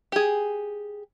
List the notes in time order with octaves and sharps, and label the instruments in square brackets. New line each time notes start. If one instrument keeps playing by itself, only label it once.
[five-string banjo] G4 G#4